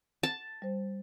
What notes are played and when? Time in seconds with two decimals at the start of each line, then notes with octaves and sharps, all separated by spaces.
0.23 A5
0.62 G3 C5